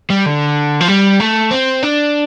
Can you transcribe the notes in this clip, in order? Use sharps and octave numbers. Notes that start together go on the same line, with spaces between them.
G3
D3
F3
G3
A3
C4
D4